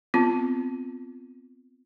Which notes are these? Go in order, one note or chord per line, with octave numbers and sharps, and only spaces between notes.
B3 C4 F4